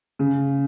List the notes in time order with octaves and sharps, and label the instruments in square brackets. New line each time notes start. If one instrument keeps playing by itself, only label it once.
[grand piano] C#3